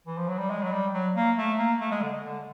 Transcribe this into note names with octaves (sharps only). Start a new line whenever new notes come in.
E3
F3
F#3
G3
G#3
F#3
G3
F#3
A#3
A3
A#3
A3
G#3
D3
D3